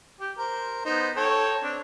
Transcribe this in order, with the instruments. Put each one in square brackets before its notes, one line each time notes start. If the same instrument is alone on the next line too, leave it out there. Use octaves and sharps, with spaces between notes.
[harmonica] G4
A#4 C5
B3 D#4 C5
A4 C#5 G5
C4 D4